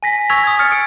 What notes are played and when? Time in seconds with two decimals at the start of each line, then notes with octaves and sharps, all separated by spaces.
0.03 G#5 A#6 B6
0.30 C#6 E6 G#6 B6 F7
0.44 D#6 G#6
0.59 D#6 F6 A6 C#7
0.72 D#6 F6 C#7 D7